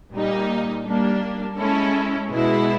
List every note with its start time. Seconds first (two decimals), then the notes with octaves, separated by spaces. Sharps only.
0.13 A#2 G3 A#3 D#4
0.86 G3 A#3 D4
1.57 G#3 C#4 E4 A4
2.30 B2 G#3 B3 E4